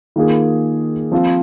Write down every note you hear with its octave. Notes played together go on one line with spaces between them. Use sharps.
D#3 A#3 F4 G#4
F3 C4 F4